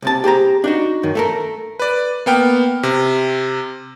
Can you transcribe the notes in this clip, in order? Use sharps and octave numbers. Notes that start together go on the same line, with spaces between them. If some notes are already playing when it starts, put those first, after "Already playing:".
C2 C3 A5
G4 G#4 C5 A#5
D4 D#4 F#4
F#2 D#3
A3 A4 A#4
B4 D5
A#3 B3 G5 F6
C3